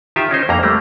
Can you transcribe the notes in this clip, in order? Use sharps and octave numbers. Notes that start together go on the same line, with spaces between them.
D#3 F4 G4 E5
C#4 D#4 C5
F2 A#3 A#5
G3 A3 A#3